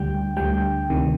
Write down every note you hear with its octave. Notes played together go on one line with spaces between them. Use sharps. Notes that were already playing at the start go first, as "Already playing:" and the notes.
Already playing: D2 D3 G3 G5
D2 D3 G3 G5
D2 C3 D#3